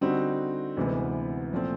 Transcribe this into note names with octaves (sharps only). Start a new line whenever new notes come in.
D3 G3 C4 D#4 F#4
D2 C3 E3 G#3 B3
A#2 F3 A3 C4